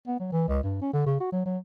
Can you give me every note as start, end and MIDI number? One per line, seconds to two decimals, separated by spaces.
0.07 0.19 59
0.20 0.27 54
0.32 0.47 52
0.48 0.60 37
0.63 0.78 43
0.81 0.93 61
0.93 1.06 50
1.06 1.19 49
1.20 1.28 66
1.32 1.42 54
1.46 1.58 54